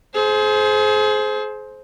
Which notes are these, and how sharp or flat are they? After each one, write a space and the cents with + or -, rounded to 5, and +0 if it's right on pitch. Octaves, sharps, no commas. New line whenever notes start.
G#4 +35 C5 +0